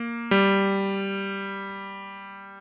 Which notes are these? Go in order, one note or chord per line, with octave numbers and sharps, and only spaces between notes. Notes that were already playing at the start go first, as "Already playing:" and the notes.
Already playing: A#3
G3